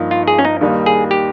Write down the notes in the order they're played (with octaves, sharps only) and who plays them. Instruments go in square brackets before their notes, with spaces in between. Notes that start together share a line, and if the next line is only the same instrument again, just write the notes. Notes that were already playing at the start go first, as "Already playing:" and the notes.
Already playing: [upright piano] G2 F3 A#3 D#4
[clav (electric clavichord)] F4
G#4
C#4
D#4
[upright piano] D#2 D#3 G3 A#3 D#4
[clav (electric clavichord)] G#4
G4